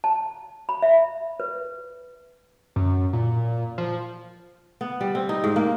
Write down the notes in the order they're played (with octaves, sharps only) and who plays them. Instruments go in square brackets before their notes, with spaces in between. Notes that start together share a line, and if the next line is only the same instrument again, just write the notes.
[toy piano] A5
B5
E5
B4
[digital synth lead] F#2
A#2
F3
[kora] B3
G3
C4
D#4
G#2
A#3